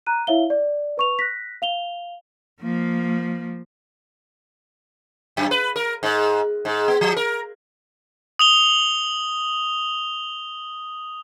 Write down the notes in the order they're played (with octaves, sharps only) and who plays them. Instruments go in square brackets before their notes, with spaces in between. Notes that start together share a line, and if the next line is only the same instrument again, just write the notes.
[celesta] A#5 F#6 D#7
E4 C#5 E5 F5 G7
D5
B4 C#6 F7
F#6 A#6 B6
F5 F7 G7
[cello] F3 A#3
[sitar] F#2
B4
A#4
G#2
G#2
B3
F3
A#4
[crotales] D#6 F7 G7